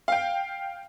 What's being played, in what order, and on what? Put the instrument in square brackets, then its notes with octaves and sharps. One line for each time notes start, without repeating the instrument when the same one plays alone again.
[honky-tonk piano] F5 G5